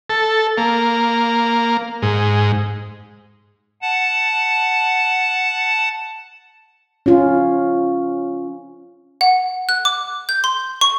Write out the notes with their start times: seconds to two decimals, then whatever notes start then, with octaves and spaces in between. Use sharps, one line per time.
0.10 A4
0.58 A#3
2.02 G#2
3.82 F#5 A5
7.06 C#4 F4
9.21 F#5
9.69 F#6
9.85 D6
10.29 G6
10.44 C6
10.81 C#6